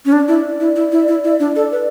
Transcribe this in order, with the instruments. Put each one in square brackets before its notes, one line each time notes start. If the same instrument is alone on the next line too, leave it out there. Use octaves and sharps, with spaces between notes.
[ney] C#4
[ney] D4 [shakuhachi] D5
[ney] E4
E4
E4
E4
E4
E4
D4
A4
B4